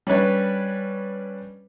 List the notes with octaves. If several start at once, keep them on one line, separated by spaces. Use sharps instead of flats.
G3 C#4 D4 B4 C#5